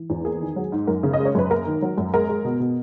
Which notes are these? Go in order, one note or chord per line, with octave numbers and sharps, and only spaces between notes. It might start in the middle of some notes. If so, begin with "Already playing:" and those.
Already playing: E3
E2
A#3 G#4
D#3
F#3
G#2
F#2 A#4
C#3
D#5
G#3
C#5
F#2 B4
A#3 A#4
D#3
F#3
F#2
G#3 A#4
G#3
B2
B2